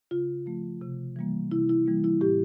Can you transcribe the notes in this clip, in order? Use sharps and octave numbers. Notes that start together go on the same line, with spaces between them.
C#3 F4
F3 A3
C3
E3 G3 A#3
C3 E4
E4
E3 G3 A#3
E4
A2 G4